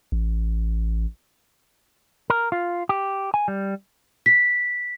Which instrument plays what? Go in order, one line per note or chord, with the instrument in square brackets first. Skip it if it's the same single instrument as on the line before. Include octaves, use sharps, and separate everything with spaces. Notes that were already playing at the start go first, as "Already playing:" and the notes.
[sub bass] A1
[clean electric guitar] A#4
F4
G4
G#5
G3
[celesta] B6